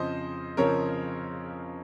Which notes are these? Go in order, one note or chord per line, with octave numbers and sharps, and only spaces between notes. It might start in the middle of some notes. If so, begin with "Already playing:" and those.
Already playing: F2 C#3 F3 C5 D#5
F2 C#3 F3 A#4 C#5